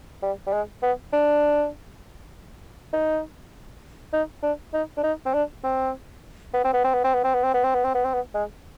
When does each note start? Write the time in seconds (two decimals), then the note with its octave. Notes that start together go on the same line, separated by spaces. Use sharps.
0.23 G3
0.47 G3
0.53 G#3
0.83 B3
1.13 D4
2.93 D#4
4.13 D#4
4.43 D4
4.74 D#4
4.97 D4
5.04 D#4
5.26 C4
5.34 D4
5.64 C4
6.54 B3
6.64 C4
6.74 B3
6.84 C4
6.94 B3
7.04 C4
7.14 B3
7.24 C4
7.34 B3
7.44 C4
7.54 B3
7.64 C4
7.75 B3
7.85 C4
7.95 B3
8.05 C4
8.14 B3
8.35 G#3